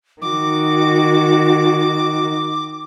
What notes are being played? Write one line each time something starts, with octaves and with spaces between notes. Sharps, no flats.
D#3 F#4 D6